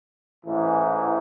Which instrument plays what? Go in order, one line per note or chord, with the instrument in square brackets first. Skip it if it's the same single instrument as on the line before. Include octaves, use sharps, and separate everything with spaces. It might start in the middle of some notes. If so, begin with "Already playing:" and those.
[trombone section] A1 G#2 E3